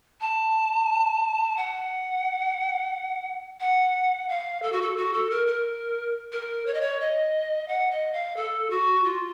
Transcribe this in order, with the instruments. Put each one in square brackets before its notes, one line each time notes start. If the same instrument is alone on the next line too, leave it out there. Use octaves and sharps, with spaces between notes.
[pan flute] A5
F#5
F#5
F5
A4
F#4
A4
F#4
A4
A#4
A#4
A#4
C#5
D#5
C#5
D#5
F#5
D#5
F5
A4
F#4
F4